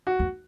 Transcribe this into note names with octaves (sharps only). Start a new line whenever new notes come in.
F#4
E2